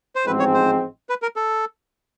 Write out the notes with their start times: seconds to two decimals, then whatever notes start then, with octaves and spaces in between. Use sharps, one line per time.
0.16 C5
0.25 A1 G#2 F3 G#3 C4 B4
0.39 C#5
0.54 C5
1.09 B4
1.22 A#4
1.36 A4